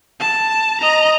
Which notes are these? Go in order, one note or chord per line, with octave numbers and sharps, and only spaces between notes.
A5
D#5 A#5